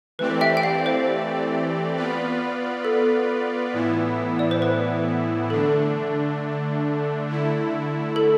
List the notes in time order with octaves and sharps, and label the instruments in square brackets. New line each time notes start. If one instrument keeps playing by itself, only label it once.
[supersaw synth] E3 A3 C4 G4 D5 [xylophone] B4
[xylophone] E5 G5
G5
F5
C5
[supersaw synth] B3 F4 B4 D5
[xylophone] A4
[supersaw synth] A2 E3 B3 E4
[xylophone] D5
C5
B4
[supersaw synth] D3 A3 D4 [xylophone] A4
[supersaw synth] D3 A3 E4
[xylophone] A4